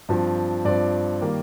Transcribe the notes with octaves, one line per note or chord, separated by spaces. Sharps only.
G2 F3 C4
G2 F3 C4 D5
D#3 G3 A#3